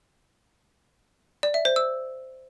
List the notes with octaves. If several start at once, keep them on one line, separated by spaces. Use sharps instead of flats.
D5
E5
C5
E6